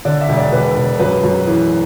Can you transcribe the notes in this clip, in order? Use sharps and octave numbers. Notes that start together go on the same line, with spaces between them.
D3 D5
E5
E1
D5
E1 B4
E1
F#2 B4
F#2
E3